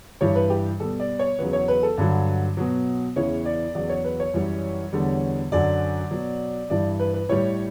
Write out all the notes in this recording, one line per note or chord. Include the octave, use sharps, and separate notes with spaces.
G2 E3 G3 C#5
B4
G4
B2 G3 A4
D5
C#5
E2 C#3 F#3 B4
C#5
B4
A4
G2 D3 F#3
B2 F#3
E2 C#3 E3 C#5
D5
E2 C#3 F#3 D5
C#5
B4
C#5
F#2 E3 G3
E2 D3 G3
F#2 D3 F#3 D5
B2 F#3
G2 E3 G3 D5
B4
B4
A2 G3 C#5